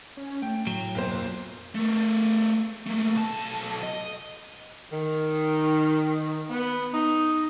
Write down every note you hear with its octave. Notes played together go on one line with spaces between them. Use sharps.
C#4
A3 G5
A2 F#3
B1 F2 A#3 C5
A3 A#4
A3 A#3
B1 A5
D#5
D#3
B3
D#4